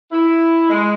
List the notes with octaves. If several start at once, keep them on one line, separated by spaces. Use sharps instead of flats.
E4
G#3